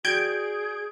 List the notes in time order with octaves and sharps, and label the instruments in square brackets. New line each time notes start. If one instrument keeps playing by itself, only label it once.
[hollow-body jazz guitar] F#4 D5 G5 [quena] G#4 [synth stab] G6 G#6 D7